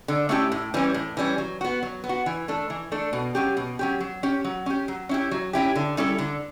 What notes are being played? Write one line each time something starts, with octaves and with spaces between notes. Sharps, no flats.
D3
A3 C#4 E4 G4
A2
E3 G3 C#4
A2
E3 G3 C#4
F#3
B3 F#4
F#3
B3
F#4
E3
A3 D4 A4
E3
A3 D4 A4
B2
F#3 C#4 G4
B2
F#3 C#4 G4
F#3
C#4 G4
F#3
C#4 G4
F#3
C#4 E4 G4
F#3
C#4 E4 G4
D3
G3 C#4 E4 A4
D3